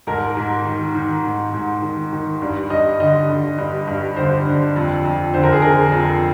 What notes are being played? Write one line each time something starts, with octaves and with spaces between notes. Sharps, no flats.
G#2 A#4
G#2
D#3
D#3
G#2
G#2
D#3
D#3
G2
G2 D#5
D3 D#5
D3
G2
G2
D3 C5
D3
F2
F2
D3 C5
A#4
G#4
D3 A#4
F2